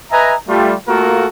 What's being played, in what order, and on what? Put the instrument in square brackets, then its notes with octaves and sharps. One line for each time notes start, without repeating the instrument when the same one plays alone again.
[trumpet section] B4 D#5 E5 G#5 A#5
G3 A3 F4
A3 A#3 F4 F#4 A4 A#4